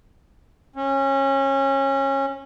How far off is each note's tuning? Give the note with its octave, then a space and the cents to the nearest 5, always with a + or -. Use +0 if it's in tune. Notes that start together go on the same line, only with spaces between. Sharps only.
C#4 -25